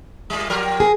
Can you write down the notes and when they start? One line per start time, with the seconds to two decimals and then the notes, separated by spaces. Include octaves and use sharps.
0.30 A#2 G3
0.50 F3 G4 A#4
0.80 G#4